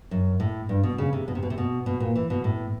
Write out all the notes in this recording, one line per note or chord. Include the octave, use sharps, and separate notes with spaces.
F#2
A2
G2
B2
C#3
C3
B2
C3
B2
C3
B2
B2
A#2
E3
B2
A2